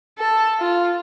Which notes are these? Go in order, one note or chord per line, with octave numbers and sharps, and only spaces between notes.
A4 A5
F4